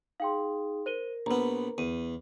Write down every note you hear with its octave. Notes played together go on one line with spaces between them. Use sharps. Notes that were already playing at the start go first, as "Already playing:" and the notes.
D#4 G#4 F5 G5 C6
A#4 C5 D#7 G7
A#1 B3 B4 A#5
E2 D#7